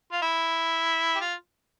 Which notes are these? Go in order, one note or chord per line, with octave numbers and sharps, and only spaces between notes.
F4
E4
G4
F4